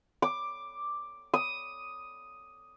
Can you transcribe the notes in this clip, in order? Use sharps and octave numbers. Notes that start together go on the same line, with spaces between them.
D6
D#6